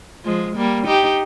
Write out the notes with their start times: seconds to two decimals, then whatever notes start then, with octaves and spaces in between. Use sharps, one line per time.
0.24 F3 G#3
0.56 G3 A#3
0.87 D#4 G4